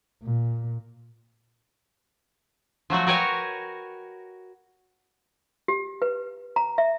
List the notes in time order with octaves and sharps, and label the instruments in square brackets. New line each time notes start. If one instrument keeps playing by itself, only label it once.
[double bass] A#2
[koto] F3 F#3 A3 F#4
F#4 A#4 B4 C#5 G5 G#5
[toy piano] G4
B4
A#5
E5